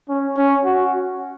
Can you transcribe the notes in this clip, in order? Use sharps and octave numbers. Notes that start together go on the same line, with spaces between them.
C#4
C#4
F#4